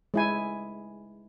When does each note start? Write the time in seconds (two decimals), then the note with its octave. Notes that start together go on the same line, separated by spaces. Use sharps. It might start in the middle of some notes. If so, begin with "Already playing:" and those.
0.14 G#3 E4 G#5